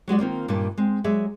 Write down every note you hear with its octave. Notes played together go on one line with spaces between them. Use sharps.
F#3 G#3 F#4 D5
D#3 A#3 C4 F4
G2 A#2 D#3 C#4 A5
G#3 C4
F#3 G#3 G#4 D5 E5